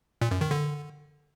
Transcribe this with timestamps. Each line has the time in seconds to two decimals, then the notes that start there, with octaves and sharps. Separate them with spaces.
0.21 A#2
0.31 F#2
0.41 D#3
0.51 D3